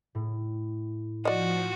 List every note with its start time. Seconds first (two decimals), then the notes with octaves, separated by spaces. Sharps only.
0.15 A2
1.25 F3 F#4 D5 D#5